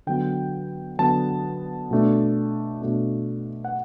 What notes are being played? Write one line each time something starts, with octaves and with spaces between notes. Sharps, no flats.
D3 F#3 B3 G5
D3 F#3 B3 A5
B2 A3 D4
B2 A3 D4
F#5